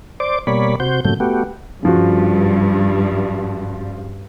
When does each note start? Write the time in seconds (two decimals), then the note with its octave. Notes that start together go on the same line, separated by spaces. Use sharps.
0.20 C5 D5 D6
0.47 B2 G3 A#3 C#5 D5 B5
0.80 C3 F#4 C5 G6
1.05 G2 A#2 C#3 F#3 A3 G6
1.20 A3 B3 F#4 G4
1.83 G2 C#3 F3 F#4